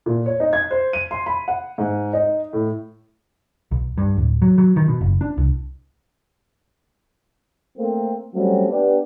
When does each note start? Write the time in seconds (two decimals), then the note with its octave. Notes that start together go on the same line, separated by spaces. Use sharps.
0.06 A#2
0.26 C#5
0.40 D#4
0.53 G#6
0.71 C5
0.93 D#7
1.11 C6
1.26 B5
1.48 F#5
1.78 G#2
2.13 D#4
2.53 A2
3.71 B1
3.98 G2
4.17 D1
4.42 F#3
4.58 F#3
4.76 D#3
4.88 B2
5.01 F#1
5.21 D4
5.37 C2
7.78 A3 A#3 C4
8.34 F#3 G3 A3 C4 C#4 F#4
8.69 B3 D4 G4